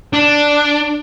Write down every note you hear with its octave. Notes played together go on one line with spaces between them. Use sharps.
D4